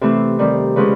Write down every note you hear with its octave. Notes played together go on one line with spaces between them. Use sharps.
C3 E3 A3 C4 A4
D#3 G3 C4
C#3 F3 G#3 C#4 B4